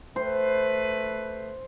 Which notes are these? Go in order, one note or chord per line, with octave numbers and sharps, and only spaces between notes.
A3 B4 C5